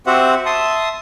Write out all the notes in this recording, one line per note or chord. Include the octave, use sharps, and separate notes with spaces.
C4 F#4 G4 C5 E5 F#5
E5 A5 C6 D#6